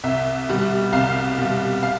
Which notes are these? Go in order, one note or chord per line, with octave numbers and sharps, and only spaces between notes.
C2 E5
B2 G3
C2 F5
B2 G3
F5